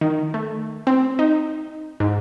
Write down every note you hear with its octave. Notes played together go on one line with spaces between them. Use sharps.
D#3
A3
C4
D#4
G#2